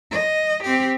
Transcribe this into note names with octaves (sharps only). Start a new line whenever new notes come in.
D#5
C4 G4